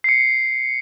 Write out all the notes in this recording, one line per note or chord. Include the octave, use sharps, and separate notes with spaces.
C7 C#7